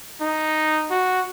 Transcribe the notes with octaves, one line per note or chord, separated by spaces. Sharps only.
D#4
F#4